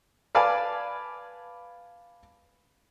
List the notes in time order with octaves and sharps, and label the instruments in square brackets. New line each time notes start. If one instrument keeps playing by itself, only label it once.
[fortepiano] B4 D5 F5 G#5 A5